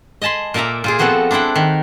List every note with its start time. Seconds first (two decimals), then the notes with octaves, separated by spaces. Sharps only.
0.22 D#5 G#5 A5 B5 C6
0.54 A#2 A#4 D5 E5 A#5
0.84 A#2 F4 G#4
0.99 F3 B3 C4 F#4 A4 F#5
1.31 D4 E4 C5 F#5 G5
1.55 D#3